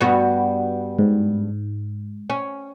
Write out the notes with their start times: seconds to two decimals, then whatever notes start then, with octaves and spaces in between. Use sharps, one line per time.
0.01 G2 B3 F#4
0.99 G#2
2.30 C#4